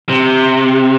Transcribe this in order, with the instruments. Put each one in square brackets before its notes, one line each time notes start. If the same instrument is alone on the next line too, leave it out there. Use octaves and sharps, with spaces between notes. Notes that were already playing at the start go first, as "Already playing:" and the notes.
[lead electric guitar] C3